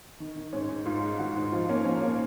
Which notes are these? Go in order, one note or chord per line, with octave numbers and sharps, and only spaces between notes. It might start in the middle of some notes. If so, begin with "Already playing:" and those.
D#3
D#3
G#2 C#4
G#2
G#2 F4
G#3
D#3 F#4
G#2
F3 F4
A#3 C#4
F3 C#4
A#3 C#4